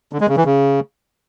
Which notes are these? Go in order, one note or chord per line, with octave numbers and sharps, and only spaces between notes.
D3
G#3
C#3
E3
C#3